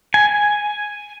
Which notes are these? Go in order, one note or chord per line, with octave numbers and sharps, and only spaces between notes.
G#5